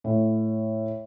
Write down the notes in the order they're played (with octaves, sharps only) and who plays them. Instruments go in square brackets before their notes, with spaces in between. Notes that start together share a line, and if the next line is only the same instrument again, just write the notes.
[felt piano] A2